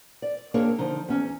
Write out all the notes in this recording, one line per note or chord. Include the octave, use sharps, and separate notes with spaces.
D5
A#3 C4 D4 G#4 A#4 C#5
D3 F3 D#4
E2 C#4